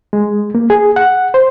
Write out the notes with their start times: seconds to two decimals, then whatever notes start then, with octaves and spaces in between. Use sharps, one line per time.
0.13 G#3
0.55 A#3
0.70 G#4
0.96 F#5
1.34 C5